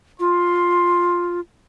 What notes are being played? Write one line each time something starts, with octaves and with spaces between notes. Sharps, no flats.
F4 C6